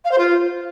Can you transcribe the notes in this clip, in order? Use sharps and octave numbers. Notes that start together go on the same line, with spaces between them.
F5
C5
F4